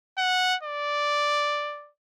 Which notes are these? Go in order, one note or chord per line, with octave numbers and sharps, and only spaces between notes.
F#5
D5